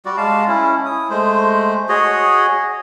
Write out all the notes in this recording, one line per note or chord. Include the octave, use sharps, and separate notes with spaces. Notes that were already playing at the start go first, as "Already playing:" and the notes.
G3 F#4 D5
G#3 F5 A5
C#4 E4
E4 D#6
G#3 A3 C5
F#4 G#4 C#5 D#5